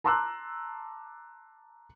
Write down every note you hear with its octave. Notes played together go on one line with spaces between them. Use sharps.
A5 A#5 C6 D6 E6 F#6